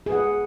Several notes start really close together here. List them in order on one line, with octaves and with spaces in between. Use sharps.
G#4 B4 F#5